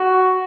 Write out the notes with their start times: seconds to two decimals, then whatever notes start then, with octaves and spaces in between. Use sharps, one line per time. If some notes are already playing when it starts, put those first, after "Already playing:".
Already playing: F#4